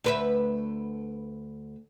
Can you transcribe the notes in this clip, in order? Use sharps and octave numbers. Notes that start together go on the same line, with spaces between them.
D2 B4 E5